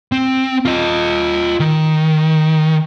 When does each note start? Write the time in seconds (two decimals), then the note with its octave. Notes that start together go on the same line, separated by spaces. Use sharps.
0.12 C4
0.65 F4 D#5
1.60 D#3